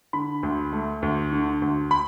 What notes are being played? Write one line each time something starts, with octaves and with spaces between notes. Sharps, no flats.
D3 B5
D2
A3
D2
D3
D2
B5